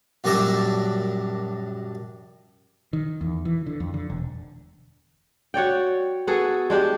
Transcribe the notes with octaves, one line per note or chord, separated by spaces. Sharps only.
A#1 F#2 G3 D4 A#4 E5
D#3
E2
E3
D3
F2
D3
E1
F#4 C#5 D5 G5
B3 F#4 G#4 A4
G#3 D4 G4